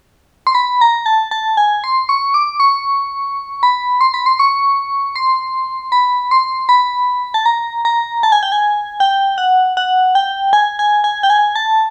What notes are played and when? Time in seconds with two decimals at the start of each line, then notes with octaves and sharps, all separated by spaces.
0.47 C6
0.55 B5
0.81 A#5
1.06 A5
1.31 A5
1.57 G#5
1.84 C6
2.09 C#6
2.34 D6
2.60 C#6
3.63 B5
4.01 C6
4.14 B5
4.26 C6
4.39 C#6
5.16 C6
5.92 B5
6.31 C6
6.69 B5
7.34 A5
7.46 A#5
7.85 A#5
8.23 A5
8.32 G#5
8.43 G5
8.52 G#5
9.00 G5
9.38 F#5
9.77 F#5
10.15 G5
10.53 G#5
10.79 G#5
11.04 G#5
11.23 G5
11.30 G#5
11.56 A5